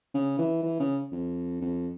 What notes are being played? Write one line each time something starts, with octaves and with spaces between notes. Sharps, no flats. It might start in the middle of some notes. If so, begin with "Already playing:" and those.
C#3
E3
E3
C#3
F2
F2